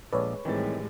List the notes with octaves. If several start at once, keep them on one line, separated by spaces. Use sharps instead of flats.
A#1 G#3 A4 B4 C#5 D5
A2 D#3 E3 G3 G#3 C4 A6